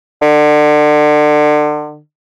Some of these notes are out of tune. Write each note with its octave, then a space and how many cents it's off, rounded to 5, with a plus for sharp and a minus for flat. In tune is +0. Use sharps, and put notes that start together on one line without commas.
D3 +30